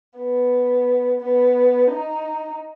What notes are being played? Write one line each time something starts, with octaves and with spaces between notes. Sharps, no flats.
B3
B3
D#4